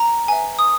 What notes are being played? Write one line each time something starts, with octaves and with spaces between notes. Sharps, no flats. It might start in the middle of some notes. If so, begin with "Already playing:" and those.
Already playing: A#5
B4 E5 G#5
D#6